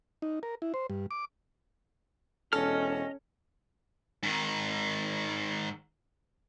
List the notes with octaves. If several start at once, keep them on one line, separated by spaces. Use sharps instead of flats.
D#4
A#4
E4
C5
G2
D6
E1 C#4 A4 D#5 F6
G#2 D#3